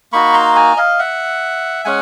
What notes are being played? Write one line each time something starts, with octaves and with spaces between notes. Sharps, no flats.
A#3 D#4 F#4 B5 C#6
A#5 C6
G#5 A#5
D#5 F5
E5 F#5
G#3 C#4 F#5 G#5